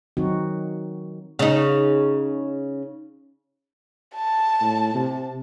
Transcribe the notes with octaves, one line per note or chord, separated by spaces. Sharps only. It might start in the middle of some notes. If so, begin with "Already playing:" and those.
D#3 F#3 C4 D#4 F#4
C#3 D#4
A5
A2
C3